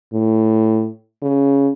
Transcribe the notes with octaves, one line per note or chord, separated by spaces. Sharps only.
A2
C#3